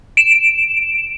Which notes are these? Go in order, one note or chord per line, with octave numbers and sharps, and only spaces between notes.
D7 E7